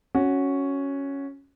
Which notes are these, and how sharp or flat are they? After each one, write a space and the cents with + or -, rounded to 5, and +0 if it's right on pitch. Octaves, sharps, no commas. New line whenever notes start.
C#4 +0 F#4 +0